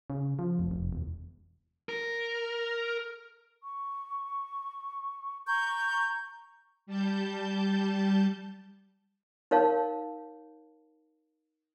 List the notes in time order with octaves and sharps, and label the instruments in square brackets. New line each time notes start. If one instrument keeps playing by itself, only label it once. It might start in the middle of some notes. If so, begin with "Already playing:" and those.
[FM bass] C#3
F3
F1
F1
E1
[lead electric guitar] A#4
[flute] C#6
[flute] A#5 [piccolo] C#6 [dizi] G6
[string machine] G3 A5 G6
[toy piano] D#4 A#4 C#5 F5 A5